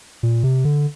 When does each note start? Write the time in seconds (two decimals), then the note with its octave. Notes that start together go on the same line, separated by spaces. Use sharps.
0.23 A#2
0.43 C3
0.65 D3